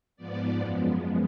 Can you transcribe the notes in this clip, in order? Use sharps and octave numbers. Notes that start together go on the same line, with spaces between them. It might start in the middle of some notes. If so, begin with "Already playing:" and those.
G#2 F3 B3 D5
F#2 F3 G#3 B3